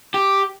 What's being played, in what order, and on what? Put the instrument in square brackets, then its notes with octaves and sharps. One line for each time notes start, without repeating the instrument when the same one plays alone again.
[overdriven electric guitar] G4